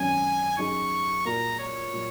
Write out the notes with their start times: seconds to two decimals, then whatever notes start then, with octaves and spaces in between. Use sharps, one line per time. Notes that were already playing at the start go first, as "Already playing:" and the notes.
Already playing: G#1 F#2 F#3 C#4 G#5
0.58 F#2 F#3 D#4 G#4 C#6
1.25 A#2 A#3 F#4 A#4 A#5
1.59 C#5
1.93 A#2 F#3